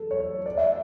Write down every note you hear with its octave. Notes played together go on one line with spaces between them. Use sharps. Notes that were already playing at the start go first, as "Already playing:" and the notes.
Already playing: A4
C#5
D5
E5